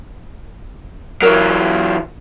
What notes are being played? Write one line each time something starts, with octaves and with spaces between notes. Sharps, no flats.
E3 F#3 A#4 C#5